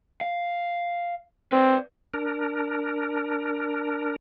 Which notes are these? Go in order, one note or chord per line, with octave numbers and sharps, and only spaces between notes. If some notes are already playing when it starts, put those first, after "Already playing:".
F5
C4 B4 D5
D4 A#4